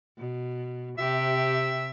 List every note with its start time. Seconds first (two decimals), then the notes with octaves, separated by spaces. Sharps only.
0.18 B2
0.98 C3 G4 E5